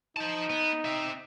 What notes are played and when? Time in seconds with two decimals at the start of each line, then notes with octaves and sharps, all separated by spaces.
0.17 D#4 C5 A5
0.50 B3
0.85 C4 E5